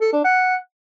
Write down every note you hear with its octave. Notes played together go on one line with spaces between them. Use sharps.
A4
D4
F#5